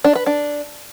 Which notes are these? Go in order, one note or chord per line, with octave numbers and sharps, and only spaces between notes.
D4
B4
D4